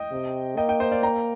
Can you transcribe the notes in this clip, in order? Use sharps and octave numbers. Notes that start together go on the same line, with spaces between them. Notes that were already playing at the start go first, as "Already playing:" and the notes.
Already playing: D#5 G5
C3
A#3 D#5 G5
D#5 G5
C5 D#5
D5 F5
G5 A#5